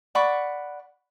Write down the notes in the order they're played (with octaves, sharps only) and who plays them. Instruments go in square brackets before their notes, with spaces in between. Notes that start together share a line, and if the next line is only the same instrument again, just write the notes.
[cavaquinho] D5 F#5 B5 C#6